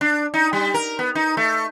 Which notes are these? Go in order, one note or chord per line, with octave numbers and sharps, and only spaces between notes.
D4
D#4
G3
A#4
B3
D#4
A3